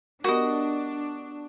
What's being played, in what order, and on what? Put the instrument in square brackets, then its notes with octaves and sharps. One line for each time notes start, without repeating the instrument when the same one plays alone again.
[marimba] B3 G4 A#4 [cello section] D4 [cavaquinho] F#4 D#5